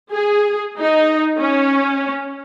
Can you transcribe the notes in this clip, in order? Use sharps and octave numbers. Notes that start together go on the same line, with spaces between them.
G#4
D#4
C#4